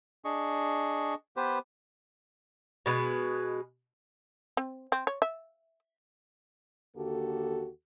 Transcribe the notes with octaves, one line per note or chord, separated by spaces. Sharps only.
D4 G#4 D#5 C#6
B3 G4 B4 C5
B2 G#3 B4
C4
C4
C#5
E5
D#2 D3 A#3 F#4 G4 A4